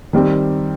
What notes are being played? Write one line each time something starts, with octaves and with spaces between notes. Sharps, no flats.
D#3 G3 C4 G4